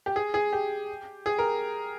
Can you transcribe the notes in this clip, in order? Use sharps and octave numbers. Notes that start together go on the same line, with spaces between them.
G4
G#4
G#4
G4
G#4
A#4